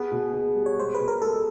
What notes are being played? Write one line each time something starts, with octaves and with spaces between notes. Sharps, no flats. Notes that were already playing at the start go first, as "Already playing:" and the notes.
Already playing: B3 G#4
B2
B2
G3
C#5
G#3 C5
B4
B2
A#4
G#3 A4